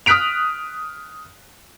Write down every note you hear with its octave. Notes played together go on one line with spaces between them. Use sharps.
D#6 F6 F#6 B6 D7 F7